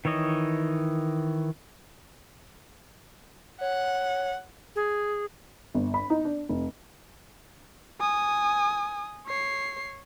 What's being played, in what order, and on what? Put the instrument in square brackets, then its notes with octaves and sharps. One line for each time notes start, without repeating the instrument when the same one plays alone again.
[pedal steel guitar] D#3 E3 C#5 D#5
[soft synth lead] C#5 [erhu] F#5
[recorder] G#4
[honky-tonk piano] G1
B5
D#4
D4
F1
[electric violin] G#5 D#6
C#5 C7